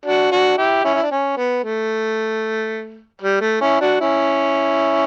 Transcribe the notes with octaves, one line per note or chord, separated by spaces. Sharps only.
D4 F#4
D4 F#4
E4 G4
C#4 E4
E4
D4
C#4
B3
A3
G3
A3
C#4 E4
D4 F#4
C#4 E4